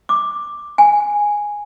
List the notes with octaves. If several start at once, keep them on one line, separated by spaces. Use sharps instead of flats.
D6
G#5